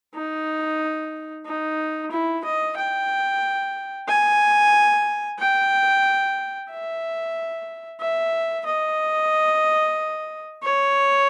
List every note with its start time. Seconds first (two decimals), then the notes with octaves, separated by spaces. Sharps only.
0.15 D#4
1.46 D#4
2.11 E4
2.44 D#5
2.77 G5
4.08 G#5
5.39 G5
6.70 E5
8.01 E5
8.66 D#5
10.63 C#5